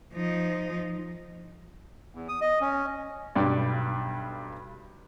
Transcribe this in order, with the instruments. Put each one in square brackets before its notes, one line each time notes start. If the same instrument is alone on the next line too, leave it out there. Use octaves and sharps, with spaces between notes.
[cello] F3 D#4
[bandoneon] E2
D#6
D#5
C#4
[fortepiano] B1 G2 D5